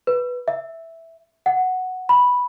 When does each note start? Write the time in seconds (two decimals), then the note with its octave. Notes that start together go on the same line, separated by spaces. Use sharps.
0.07 B4
0.48 E5
1.46 F#5
2.09 B5